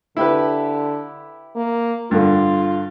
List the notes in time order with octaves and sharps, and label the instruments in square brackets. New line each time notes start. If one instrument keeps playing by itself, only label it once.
[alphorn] D3 [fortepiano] E4 G4 B4
[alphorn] A#3
[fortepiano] G2 D3 [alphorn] F4